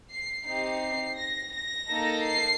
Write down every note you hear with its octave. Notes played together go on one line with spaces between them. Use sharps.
C7
C4 D#4 G4 C7
A#6
A#6
A#3 D#4 A4
C7